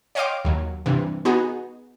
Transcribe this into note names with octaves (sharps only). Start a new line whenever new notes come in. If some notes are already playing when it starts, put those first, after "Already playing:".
C#5 D#5 F5 G5 C6 D6
D#2 F#3
G2 C3 E3
B3 D#4 F#4 G#4